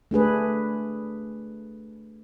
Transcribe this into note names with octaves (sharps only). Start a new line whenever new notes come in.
A3 D4 G#4 B4